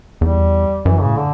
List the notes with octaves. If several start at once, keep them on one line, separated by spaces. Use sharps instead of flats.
E2 G3
F#2 E3
A2 C#3
D3